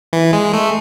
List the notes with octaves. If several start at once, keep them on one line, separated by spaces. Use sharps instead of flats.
E3
G#3
A3